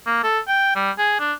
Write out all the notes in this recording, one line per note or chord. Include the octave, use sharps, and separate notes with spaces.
A#3
A4
G5
G3
G#4
D4